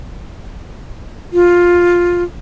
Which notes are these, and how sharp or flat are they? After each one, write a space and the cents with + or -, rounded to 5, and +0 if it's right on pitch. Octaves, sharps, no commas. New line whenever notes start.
F4 +10